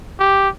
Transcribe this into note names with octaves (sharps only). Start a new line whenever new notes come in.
G4